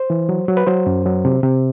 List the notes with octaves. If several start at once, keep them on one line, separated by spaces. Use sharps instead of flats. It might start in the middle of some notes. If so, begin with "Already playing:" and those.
Already playing: C5
E3
F#3
F#3
B4
F#3 C5
F#2
F#3
C3
C3